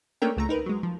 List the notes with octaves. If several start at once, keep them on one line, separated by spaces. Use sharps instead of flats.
A3 A#3 C#4 D4 A#4 G5
C#2 A3 A#5
D#4 A#4 B4
F#3 G#3
F3